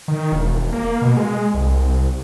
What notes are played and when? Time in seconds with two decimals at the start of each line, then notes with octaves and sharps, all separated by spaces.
0.08 D#3
0.32 E1
0.73 A#3
1.02 B2
1.17 G#3
1.54 C2